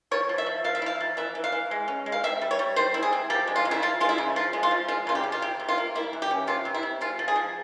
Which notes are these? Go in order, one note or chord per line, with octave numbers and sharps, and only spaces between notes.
F3 C#5
F3
E5
F3
F3 F5
E5
E4 F5
F3
E3 E5
E3
F5
E3
G#3
C#4
G#3
F5
C4 E5
G3
C#5
G3
G3 C5
E4
G#4
C4
F3 G4
G#3
F4
C#3
E4
F3 F4
G#3 F4
E4
C#3
F3 F4
G#3
F4
F3
G#3 F4
C#3 F4
G4
C#3
F4
C3 G4
C3
F4
A#3
A#3 E4
E3
G4
C#4
C3 F4
C3
E4
C3
G#3 F4
F3
G#4
F3